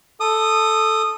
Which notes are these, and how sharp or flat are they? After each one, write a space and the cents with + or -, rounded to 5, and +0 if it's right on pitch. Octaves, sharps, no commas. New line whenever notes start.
A4 +0 D#6 -15